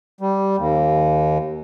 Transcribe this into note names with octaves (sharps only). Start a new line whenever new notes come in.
G3
D#2